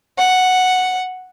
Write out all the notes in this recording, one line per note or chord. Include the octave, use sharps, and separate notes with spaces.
F#5